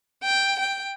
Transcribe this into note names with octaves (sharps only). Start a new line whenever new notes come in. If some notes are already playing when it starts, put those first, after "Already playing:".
G5
G5